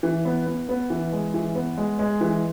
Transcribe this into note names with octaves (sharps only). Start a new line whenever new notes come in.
E3
B3
B3
B3
E3
G#3
E3
B3
G#3
G#3
E3